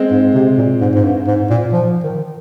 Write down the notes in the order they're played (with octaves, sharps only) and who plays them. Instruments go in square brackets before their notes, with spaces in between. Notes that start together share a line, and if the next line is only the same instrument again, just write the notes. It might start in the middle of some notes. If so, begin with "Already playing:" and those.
Already playing: [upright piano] G#3 C4
[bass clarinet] G#2
C3
A#2
G#2
G#2
G2
G#2
A#2
F3
D#3